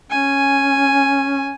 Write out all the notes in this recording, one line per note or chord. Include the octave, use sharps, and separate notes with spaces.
C#4 G#5